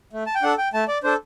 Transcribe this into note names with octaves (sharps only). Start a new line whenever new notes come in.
A3
A5
G5
D4 A4 F#5
G5
A3 A5
D5
D4 A4 C5